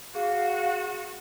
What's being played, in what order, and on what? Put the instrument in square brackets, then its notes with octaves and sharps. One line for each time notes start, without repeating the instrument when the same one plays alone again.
[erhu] F#4 [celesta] G#4 [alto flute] F5